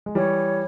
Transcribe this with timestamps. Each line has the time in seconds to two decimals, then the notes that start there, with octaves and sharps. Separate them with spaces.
0.06 G#3
0.15 E3 G3 C#5